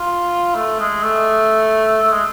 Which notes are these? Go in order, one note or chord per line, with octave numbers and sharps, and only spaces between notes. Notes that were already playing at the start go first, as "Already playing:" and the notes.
Already playing: F4
A3
G#3
A3
A3
G#3